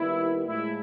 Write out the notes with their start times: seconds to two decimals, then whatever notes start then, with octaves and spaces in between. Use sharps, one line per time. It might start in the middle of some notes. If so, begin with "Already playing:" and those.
Already playing: D#2 D#3 G3 B3 E4
0.46 A2 F3 G#3 E4